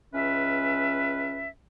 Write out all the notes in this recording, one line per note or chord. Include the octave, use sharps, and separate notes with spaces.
C#2 C#4 B4 E5